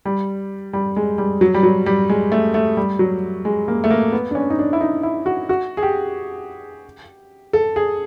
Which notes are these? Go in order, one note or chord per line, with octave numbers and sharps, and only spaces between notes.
G3
G3
G#3
G3
F#3
G3
F#3
G3
G#3
A3
A3
G3
F#3
G#3
A#3
A3
A#3
B3
D4
C#4
D#4
D4
E4
D#4
E4
F#4
F#4
G#4
G4
A4
G#4